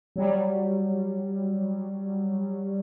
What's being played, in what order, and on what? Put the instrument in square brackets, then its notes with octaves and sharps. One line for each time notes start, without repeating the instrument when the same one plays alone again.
[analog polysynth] F#3 G3